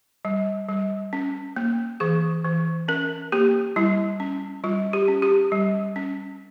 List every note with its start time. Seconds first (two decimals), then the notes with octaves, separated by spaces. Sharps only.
0.25 G3
0.68 G3
1.13 C#4
1.56 A#3
2.00 E3 G#4
2.44 E3
2.88 C#4 A#4
3.32 A#3 G4
3.76 G3 E4
4.20 C#4
4.64 G3 F4
4.93 G4
5.08 C#4
5.22 G4
5.52 G3
5.96 C#4